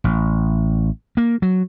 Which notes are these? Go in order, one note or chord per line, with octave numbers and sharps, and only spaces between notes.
A1
A#3
F#3